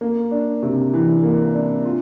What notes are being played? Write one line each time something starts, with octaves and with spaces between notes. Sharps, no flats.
A#3
D4
C3
E3
A#3
D4
F4